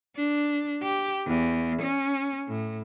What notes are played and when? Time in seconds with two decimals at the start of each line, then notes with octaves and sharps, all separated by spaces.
0.16 D4
0.83 G4
1.27 E2
1.82 C#4
2.48 A2